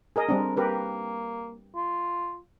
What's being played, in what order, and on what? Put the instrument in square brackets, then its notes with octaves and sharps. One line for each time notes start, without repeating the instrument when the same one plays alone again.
[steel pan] G#4 A#4 D#5
[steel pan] G3 C4 D4 [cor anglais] A#4
[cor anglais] A#3 [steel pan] G4 A#4 B4
[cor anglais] F4